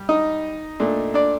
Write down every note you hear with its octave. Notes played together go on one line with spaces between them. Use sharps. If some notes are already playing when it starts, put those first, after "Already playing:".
Already playing: G3
D#4 D#5
A#2 A3 D4
D4 D5